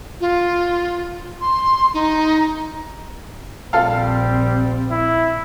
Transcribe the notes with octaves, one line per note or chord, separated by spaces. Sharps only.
F4
C6
D#4
A#1 G3 C4 F4 A4 F5
E4